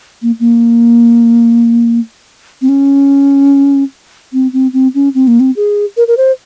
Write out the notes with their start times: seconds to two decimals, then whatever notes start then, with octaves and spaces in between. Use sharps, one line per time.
0.22 A#3
0.40 A#3
2.62 C4
2.69 C#4
4.33 C4
4.53 C4
4.73 C4
4.95 C#4
5.14 C4
5.28 A#3
5.40 C4
5.56 G#4
5.97 A#4
6.08 A#4
6.17 C5